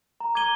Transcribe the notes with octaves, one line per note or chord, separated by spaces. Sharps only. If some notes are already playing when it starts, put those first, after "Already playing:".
A#5
D6 G#6 D#7 G7